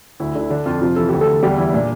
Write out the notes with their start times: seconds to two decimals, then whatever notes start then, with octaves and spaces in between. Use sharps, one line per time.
0.20 D2 E4
0.35 D3
0.41 E4
0.50 D3 D4
0.66 F2 F3 F4
0.81 C3 F3 F4
0.96 E3 A4
1.09 D2 G4
1.21 A3 A4
1.27 D2
1.43 E2 G3 G4
1.58 E3 E4
1.73 A#2 D4